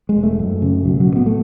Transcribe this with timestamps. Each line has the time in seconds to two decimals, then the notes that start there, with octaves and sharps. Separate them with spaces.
0.09 G#3
0.16 E1
0.23 A3
0.39 F#2
0.62 C#3
0.84 B1 F#3
1.00 F#3
1.07 A2
1.16 B3
1.26 A3